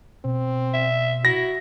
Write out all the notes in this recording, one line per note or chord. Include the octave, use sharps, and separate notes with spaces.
B2 C4
E5
E4 F#4 A#6